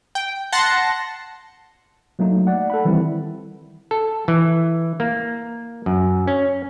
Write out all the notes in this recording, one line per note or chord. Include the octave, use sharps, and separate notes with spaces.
G5
F#5 A5 C6 A#6 C#7
F#3 A3 A#3 D#4
D5 F#5
A4 F#5 B5
D#3 E3 G3 C4 E4
A4
E3
A#3
F#2
C#4